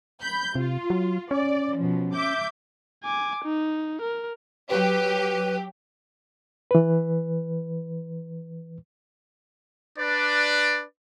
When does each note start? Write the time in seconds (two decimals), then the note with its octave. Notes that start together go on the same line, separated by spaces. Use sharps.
0.22 B5 G6
0.55 C3 F4
0.90 F#3
1.31 C#4 D5
1.77 B2 F3
2.14 E5 D6 G6
3.04 G#5 D6
3.44 D#4
4.02 A#4
4.70 F#3 G4 B4
6.71 E3 B4
9.98 D4 B4 D5